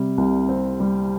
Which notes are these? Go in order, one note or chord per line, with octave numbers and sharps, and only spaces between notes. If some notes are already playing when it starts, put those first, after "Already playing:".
Already playing: C3 G3
C2
C4
G3